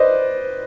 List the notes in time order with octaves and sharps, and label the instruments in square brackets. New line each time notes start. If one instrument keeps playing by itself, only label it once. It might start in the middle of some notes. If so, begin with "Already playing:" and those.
Already playing: [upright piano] B4 C5 D5 D#5